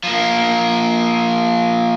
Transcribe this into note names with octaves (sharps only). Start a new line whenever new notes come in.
F3 A#3